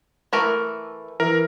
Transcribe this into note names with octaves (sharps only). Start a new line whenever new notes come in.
E3 A3 A#4
E3 A#4